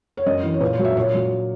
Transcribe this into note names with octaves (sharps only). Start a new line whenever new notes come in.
C#5
F#2 D#5
E3
C#5
A#2 B4
C#5
F#3
E5
A#2 C#5
F#3